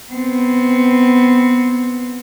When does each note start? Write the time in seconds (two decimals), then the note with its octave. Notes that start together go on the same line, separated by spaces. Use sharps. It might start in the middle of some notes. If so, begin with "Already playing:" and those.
0.12 B3 C4